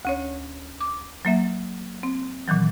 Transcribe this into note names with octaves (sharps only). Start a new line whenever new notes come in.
D2 C#4 C#5
D6
F#3 A#3 E5
C4
A#2 D#3 E3 F#3